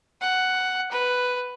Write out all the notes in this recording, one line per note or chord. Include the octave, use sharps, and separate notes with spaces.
F#5
B4